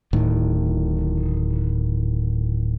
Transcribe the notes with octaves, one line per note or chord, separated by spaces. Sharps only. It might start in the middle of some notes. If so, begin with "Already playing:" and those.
D1 A2 D#3